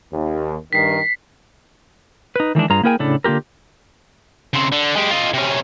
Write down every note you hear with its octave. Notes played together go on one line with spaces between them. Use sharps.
D#2
G2 D#3 B6 C7
D#4 B4
D#3 E3 G#3 D4
G2 F4 G#4 A#5
A#3 E4 G#4 A#4 G5 G#5
A2 C#3 D4 E4 A4
D3 A#3 F4 G4 A#4
C#3 C4
D3
G#3 G4
F4 D#5
C3 C#4